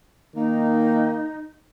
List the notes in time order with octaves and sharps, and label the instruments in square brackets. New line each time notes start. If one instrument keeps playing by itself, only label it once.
[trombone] D#3 [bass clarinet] A#3 [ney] D#4